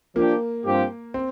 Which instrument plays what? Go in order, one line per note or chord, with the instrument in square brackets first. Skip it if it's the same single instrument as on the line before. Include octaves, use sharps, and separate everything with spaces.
[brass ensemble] F3 D4 G4 [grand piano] A#3
[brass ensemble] G2 F3 C4 G4
[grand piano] C4